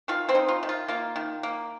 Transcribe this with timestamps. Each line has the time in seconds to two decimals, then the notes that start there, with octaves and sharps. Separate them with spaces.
0.08 D#3 F4 F5
0.29 C4 C5
0.35 D#4
0.48 F4
0.63 D#3
0.69 F4
0.88 A#3 F4
1.16 D#3
1.43 A#3